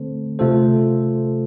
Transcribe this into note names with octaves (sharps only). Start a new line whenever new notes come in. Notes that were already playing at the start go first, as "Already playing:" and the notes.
Already playing: D3 A3 C4 A4 C5
C3 A3 F4 A4 C5